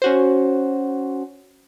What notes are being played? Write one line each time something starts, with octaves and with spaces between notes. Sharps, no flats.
C#4 F#4 C5